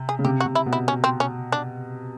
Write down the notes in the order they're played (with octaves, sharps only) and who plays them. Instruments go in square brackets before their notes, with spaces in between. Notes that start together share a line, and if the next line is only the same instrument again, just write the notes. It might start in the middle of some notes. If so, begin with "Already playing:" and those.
Already playing: [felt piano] C3
[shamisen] G#4
[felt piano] C#3
[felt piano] C3 [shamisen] G4
[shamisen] F#4
[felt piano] C3
[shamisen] E4
[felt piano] B2
[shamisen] E4
C#4
C4
C#4
D4